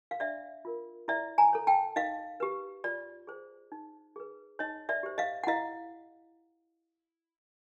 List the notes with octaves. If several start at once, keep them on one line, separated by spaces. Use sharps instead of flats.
F5
D4 D5 E5
F4 A#4
E4 D5 E5
G#5 A#5
A4 C#5
G5 A5
D#4 D#5 F5
G4 B4
F4 D5
G#4 C5
D#4
G#4 B4
D#4 C#5 D#5
D5 E5
G4 C5
D#5 F5
F#5
E4 D#5 F5